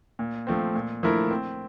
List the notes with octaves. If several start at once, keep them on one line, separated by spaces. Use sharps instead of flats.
A#2
F3 A3 C4
A#2
F3 A3 E4 A#4
C4